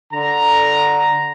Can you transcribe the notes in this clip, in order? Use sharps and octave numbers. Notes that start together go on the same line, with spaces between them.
D3 A#5